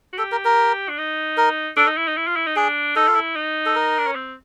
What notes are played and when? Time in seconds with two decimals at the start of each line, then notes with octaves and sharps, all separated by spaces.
0.13 F#4
0.18 G4 A4
0.32 A#4
0.45 A#4
0.89 D4
0.98 D#4
1.37 A#4
1.76 D4 A4
1.87 D#4
1.97 E4
2.07 D#4
2.17 E4
2.27 F4
2.36 E4
2.46 D#4
2.56 D4 G#4
2.96 D#4 A4
3.08 F4
3.16 E4
3.35 D#4
3.66 A4
3.75 A#4
3.98 D4
4.07 C#4
4.15 C4